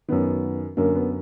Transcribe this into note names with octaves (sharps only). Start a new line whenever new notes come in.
F#2 D#3 B3
F#2 D3 A#3
B3